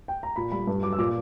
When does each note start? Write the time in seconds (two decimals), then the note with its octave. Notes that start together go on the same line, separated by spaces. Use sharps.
0.08 G5
0.23 A#5
0.36 A#2 B5
0.52 G3 B5
0.67 G2
0.83 F#3 D6
0.93 E6
0.98 A#2 D6